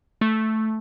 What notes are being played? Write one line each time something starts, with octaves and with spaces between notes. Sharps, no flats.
A3